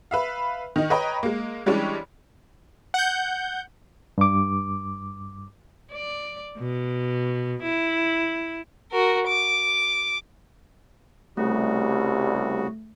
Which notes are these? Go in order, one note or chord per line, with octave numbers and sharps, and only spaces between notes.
B4 E5 F5
D#3 D#4
B4 C#5 D#5 G5 A#5
G#3 A#3
E3 G3 G#3 C#4 D4
F#5 G6
G2 D6
D5
B2
E4
F#4 A#4
D6
C2 C#3 G3 A3 F#4